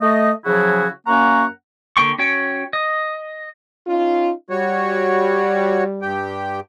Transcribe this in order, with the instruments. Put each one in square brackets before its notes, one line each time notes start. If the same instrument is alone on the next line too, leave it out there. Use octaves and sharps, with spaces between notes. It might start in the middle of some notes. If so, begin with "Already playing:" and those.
[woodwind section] A3 D#5
C#3 F3 F#3 E4 F#4 G#4
F#2 A#3 C#4 F#5 A#5 C#6
[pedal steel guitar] D3 A#3 G5 C#6
C#4 F#4 C#5 G5
D#5
[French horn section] C#4 D#4 F4
[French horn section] G3 [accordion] F#4 C#5
[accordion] G2 G4 G5